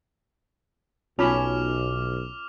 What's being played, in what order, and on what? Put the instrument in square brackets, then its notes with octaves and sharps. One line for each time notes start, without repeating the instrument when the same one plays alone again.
[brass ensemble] B1 [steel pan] C#4 B5 [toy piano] F4 A5 [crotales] D6 F6 F7